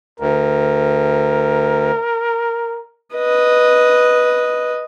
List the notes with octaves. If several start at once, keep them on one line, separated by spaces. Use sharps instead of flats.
D2 A#4
B4 D#5